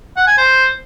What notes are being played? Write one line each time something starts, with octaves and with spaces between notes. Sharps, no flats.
F#5
G#5
C5